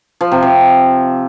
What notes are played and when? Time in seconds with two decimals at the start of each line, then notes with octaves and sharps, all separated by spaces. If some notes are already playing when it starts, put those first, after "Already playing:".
0.21 F3
0.32 C3
0.43 C3